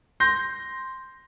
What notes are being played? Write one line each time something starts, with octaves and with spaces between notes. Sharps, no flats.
C6 G6 A#6